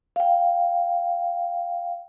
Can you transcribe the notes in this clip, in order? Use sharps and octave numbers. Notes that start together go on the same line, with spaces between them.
F5 G5